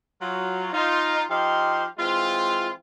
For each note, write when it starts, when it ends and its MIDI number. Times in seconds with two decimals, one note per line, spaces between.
0.21 0.69 54
0.21 0.69 65
0.73 1.23 63
0.73 1.23 65
1.30 1.85 53
1.30 1.85 63
1.30 1.85 67
1.30 1.85 77
1.30 1.85 84
1.99 2.71 52
1.99 2.71 56
1.99 2.71 60
1.99 2.71 65